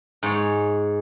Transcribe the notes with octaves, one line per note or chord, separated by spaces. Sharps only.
G#2 C#5